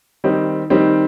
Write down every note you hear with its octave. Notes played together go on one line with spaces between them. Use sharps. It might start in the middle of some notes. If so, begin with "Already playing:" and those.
D#3 G3 C4 D#4
D#3 G3 C4 D#4